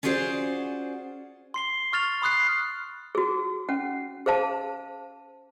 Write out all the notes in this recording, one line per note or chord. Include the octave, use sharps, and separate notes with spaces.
C#4 F4 F#4 G#4 C5 D5
C6 C7 G7
C#6 F6 A6 F7
B5 C6 D#6 F6 F#6 C7
F#4 G#4
C#4 F#5
G#4 C5 F5 A5